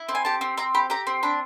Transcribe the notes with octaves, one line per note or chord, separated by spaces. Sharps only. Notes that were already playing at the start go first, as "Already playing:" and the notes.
Already playing: E4
C4
G#5
G4 A5
C4
C4 A#5
G4 B5
G4 A#5
C4
D4 B5